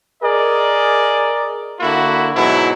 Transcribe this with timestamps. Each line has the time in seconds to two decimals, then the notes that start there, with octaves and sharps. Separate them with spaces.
0.21 G#4 A#4 D5 D#5
1.80 D3 A#3 E4 F#4
2.35 G#2 B2 F#3 E4